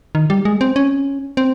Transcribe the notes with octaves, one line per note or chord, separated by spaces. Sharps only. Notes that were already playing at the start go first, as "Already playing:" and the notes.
D#3
G3
G#3
C4
C#4
C4